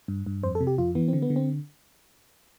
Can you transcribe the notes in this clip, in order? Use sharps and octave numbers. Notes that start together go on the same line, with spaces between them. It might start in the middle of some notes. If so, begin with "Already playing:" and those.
G2
G2
F2 C5
A4
C3
G4
F2 F4
E3 B3
D3 C4
B3
D3
C4